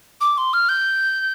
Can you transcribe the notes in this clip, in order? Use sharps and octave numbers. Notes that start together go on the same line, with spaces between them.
D6
C6
F6
G6